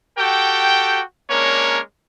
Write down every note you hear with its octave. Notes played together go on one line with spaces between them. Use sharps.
F#4 G4 A4 G5
G#3 A#3 C#4 D4 A#4 C#5